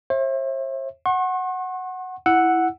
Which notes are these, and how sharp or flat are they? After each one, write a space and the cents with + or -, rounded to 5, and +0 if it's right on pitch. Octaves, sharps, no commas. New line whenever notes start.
C5 +45 E5 +0
F#5 +0 C#6 -45
E4 +0 F#5 +0 E6 +0